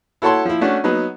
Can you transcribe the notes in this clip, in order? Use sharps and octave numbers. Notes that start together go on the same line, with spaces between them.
E4 F#4 A4 C#5 A5 C6
F3 E4
A3 C#4 D4 F#4
F#3 B3 D#4